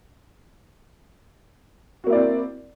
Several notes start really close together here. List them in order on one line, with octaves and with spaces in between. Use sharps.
F#4 A#3 E4 D5 C4